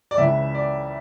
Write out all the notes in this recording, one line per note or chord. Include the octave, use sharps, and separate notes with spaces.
D5
C#2 C#3 E3 E5
D5